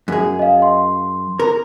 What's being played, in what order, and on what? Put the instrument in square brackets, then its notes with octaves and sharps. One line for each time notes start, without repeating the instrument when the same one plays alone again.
[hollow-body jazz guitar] F#2 G#4
[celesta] D#5 F5
C6
[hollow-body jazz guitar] A#4